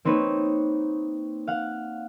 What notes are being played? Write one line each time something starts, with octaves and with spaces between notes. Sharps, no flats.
A#3 C4 D#4 B4 C#5
F5 F#5